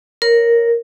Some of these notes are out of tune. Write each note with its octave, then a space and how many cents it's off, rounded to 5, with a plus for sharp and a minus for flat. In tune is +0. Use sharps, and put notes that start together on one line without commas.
A#4 +0 C#5 +0